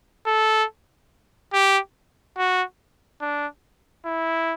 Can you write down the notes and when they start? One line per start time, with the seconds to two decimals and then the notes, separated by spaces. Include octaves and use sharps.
0.27 A4
1.53 G4
2.37 F#4
3.22 D4
4.05 E4